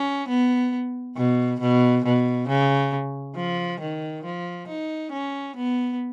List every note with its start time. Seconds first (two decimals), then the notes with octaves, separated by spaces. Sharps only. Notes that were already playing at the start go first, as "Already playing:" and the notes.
Already playing: C#4
0.28 B3
1.16 B2
1.60 B2
2.05 B2
2.48 C#3
3.36 F3
3.80 D#3
4.24 F3
4.68 D#4
5.12 C#4
5.56 B3